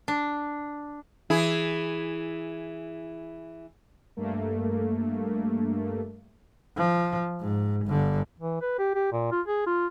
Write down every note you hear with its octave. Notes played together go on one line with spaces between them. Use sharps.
D4
E3 E4 G#4
G2 A3 A#3
F3
G#2
G1 D3
E3
B4
G4
G4
A#2
F4
G#4
F4